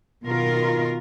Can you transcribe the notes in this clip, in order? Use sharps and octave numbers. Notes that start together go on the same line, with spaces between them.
B2 D#3 F4 A#4